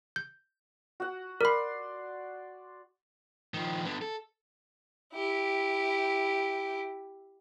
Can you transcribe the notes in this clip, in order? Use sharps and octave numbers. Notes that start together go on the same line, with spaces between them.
G6
F#4 F#5
A#4 D5 B5 C6
D#3 F3
D3 B3
A4
E4 G4